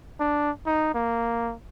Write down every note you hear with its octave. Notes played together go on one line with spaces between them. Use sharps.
D4
D#4
A#3